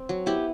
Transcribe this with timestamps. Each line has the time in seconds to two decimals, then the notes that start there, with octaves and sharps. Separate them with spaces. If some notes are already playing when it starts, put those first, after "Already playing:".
Already playing: C4
0.09 F#3
0.26 B3 E4 G4